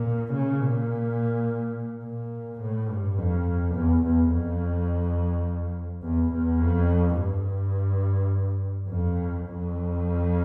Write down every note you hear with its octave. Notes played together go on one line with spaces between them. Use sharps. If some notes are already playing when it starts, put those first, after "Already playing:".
Already playing: A#2
C#3
A#2
A#2
A2
G2
F2
E2
E2
F2
E2
E2
F2
G2
F2
F2